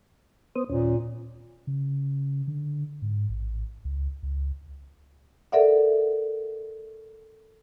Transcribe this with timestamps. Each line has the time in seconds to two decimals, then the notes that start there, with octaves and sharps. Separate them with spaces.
0.56 B3 C5 D#6
0.69 D#2 A#2 C#4
1.67 C#3
2.47 D3
3.02 G#2
3.29 A1
3.85 C#2
4.23 C#2
5.52 A4 A#4 D5 E5 F#5